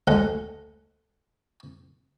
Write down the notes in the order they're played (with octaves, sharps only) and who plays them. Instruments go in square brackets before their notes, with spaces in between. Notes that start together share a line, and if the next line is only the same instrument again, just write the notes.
[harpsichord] D2 G#3 A4 F#5